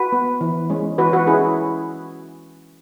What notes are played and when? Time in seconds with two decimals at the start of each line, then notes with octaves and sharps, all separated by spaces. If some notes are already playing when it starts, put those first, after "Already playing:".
Already playing: F#4 B4
0.12 B3
0.41 E3
0.70 G#3 C#4
0.98 E3 F#4 B4
1.13 F#4 B4
1.27 C#4 E4 G#4